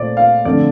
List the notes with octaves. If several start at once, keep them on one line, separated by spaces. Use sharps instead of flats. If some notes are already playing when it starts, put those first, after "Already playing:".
Already playing: A#2 A3 C5 D5
F5
F2 D3 A3 D5